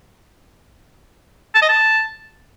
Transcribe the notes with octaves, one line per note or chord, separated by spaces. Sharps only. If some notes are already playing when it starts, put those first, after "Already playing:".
A5
D#5
A5